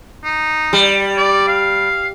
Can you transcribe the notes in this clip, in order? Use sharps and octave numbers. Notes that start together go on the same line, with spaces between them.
D#4
G3
D5
F5